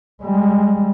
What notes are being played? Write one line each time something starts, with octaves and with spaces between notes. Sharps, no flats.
G3 G#3